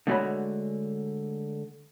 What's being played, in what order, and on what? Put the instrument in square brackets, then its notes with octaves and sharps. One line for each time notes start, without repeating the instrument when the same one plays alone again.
[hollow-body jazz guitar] D3 G#3 A3 F#4 C#5 B5